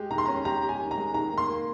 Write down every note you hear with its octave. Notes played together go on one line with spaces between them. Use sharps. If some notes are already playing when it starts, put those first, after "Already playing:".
Already playing: G#3 G4
D#3 A#5
C6
C#4 A#5
G4 A#5
G4
G#5
D#3
A#5
G#3
D#3 A#5
A#3
C6
A#3